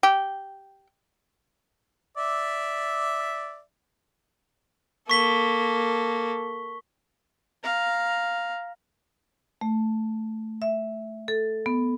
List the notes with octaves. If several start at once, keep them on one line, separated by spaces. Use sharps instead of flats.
G4
D5 E5
A#3 A4 C#6 B6 G7
F5 A#5
A3
E5
A4
B3